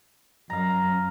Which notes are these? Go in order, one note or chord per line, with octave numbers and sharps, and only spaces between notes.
F#2 F5 A#5